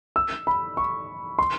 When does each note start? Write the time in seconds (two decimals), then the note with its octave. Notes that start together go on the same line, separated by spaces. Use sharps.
0.16 E6
0.47 B5
0.77 C#6
1.39 C6